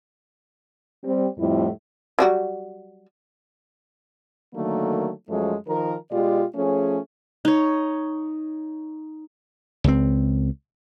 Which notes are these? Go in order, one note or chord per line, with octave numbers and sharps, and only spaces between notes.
G3 C4
F2 A2 G3 E4
F#3 G3 F#4
D3 D#3 F#3 A3 A#3
F#2 F3 G#3 A3
D#3 F3 A#4
B2 G#3 F4 G4 D5
F3 A3 C#4 G#4 C#5
D#4 C#5
C#2 C4